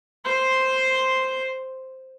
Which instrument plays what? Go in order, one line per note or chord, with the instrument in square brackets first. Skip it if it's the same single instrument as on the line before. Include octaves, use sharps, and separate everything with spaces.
[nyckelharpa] C5 C6